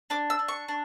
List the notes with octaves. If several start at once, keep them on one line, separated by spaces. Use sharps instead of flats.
D4 D6
E6
D4
C#6
D4